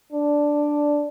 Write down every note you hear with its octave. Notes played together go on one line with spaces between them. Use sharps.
D4